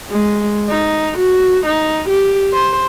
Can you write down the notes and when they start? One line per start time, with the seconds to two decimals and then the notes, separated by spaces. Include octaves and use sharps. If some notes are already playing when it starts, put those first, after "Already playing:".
0.10 G#3
0.69 D#4
1.18 F#4
1.66 D#4
2.09 G4
2.53 C5